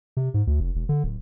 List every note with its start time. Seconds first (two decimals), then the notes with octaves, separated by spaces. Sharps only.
0.17 C3
0.34 G#2
0.47 D2
0.60 F1
0.75 E1
0.89 D3
1.04 D1